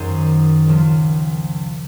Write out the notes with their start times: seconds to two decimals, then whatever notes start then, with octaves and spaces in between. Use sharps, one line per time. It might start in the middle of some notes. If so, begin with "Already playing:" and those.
Already playing: F#2 D#3 F#3 G#4 C5
0.67 C#2 C#3 F3